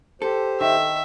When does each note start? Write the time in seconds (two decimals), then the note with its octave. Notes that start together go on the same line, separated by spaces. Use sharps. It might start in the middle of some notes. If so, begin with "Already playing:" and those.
0.22 G4 A4 C5
0.60 D#3 E5